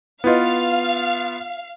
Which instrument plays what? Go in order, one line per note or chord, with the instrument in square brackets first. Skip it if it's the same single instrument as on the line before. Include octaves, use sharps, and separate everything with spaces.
[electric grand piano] B3 F4 [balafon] E4 B4 D#5 [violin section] F5